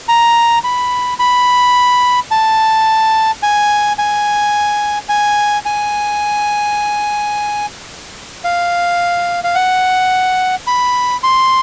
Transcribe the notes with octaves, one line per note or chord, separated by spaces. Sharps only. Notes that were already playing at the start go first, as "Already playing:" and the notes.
A#5
B5
B5
A5
G#5
G#5
G#5
G#5
F5
F5
F#5
B5
C6